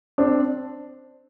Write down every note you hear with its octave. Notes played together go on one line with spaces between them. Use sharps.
C4 D4